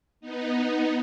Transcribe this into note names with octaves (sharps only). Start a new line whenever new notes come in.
B3 D#4